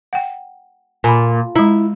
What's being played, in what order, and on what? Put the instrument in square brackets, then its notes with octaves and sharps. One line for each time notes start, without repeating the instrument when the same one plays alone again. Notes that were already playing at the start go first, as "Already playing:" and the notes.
[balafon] F#5 G5
[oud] A#2 [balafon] G#5 B5
[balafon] G#3 A#5 [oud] E4